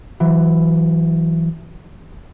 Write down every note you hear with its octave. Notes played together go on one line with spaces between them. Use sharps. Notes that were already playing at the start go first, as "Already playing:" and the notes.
E3 F#3